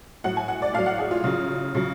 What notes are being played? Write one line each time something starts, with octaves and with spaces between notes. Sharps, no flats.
A2 F#3 F#5
G#5
F#5
D5
A2 F#3 F5
F#5
G#4
F4
C#3 F#3
C#3 F#3